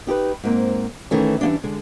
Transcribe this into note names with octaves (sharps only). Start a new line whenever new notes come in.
D#4 G4 G#4 B4
G#2 A#3 C4
D#3 E3 A3 C#4
E3 G3 A#3 C#4 D4
D3 G#3